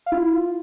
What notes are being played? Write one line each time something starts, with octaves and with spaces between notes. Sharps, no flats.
F5
E4
F4